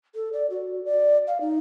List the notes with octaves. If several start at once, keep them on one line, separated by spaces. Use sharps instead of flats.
A4
D5
F#4
D5
F5
D#4